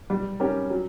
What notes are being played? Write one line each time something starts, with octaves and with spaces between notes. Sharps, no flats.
G3
C#4 G4 A#4
F#3